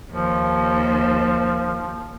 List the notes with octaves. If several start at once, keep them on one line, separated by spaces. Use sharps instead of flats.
D#2 F3